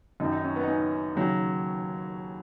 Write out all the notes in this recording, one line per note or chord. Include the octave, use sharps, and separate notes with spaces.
F#2 D#3 F#3 D#4
D#4
C#4
B3
D#4
C#4
D#2 C#3 F#3